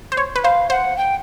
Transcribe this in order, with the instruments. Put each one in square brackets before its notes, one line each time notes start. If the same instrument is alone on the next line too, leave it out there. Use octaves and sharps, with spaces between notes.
[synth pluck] C5
C#5
B4
[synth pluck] C5 [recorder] F5
[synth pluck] C5 [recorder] F#5
[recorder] G5